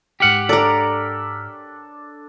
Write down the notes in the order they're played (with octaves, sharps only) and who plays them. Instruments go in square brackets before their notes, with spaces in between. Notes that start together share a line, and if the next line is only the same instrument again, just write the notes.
[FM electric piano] G#2 F6 B6 [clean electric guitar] G4 F#5
[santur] D4 A4 [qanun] A#4 D5